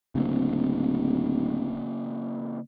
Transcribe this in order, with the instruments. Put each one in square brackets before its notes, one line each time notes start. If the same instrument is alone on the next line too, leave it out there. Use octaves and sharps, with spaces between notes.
[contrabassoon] D1 [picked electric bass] C#3 A#3 C4